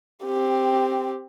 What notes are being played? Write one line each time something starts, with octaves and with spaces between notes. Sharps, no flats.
C4 G4